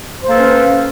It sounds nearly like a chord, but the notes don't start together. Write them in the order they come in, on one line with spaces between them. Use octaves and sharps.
C5 A#3 A4 B4 C#4